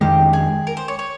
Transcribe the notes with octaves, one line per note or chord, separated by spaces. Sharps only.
F2 D#3 G#3 G4
G#4
A#4
C5
C#5
C#5